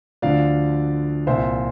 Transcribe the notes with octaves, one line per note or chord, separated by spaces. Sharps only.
D2 D3 F3 D5 F5
C2 A#2 F3 C5 E5